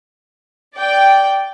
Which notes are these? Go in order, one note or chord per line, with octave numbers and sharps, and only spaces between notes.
D5 G5